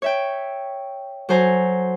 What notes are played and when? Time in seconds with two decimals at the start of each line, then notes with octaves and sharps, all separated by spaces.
0.02 C#5 E5 G5
1.29 F#3 A4 C5 G#5 A#5